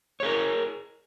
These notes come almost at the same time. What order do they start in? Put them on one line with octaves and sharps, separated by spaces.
C#5 G#4 A#4